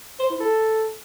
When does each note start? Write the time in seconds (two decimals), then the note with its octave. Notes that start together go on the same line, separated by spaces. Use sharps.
0.20 C5
0.30 E4
0.40 A4